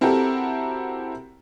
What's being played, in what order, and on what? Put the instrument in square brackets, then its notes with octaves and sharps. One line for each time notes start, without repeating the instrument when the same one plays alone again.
[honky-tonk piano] C4 E4 F#4 G4 A4 A#4